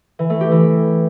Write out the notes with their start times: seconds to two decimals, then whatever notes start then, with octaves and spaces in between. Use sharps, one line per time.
0.19 E3
0.30 A3
0.41 G4
0.51 E3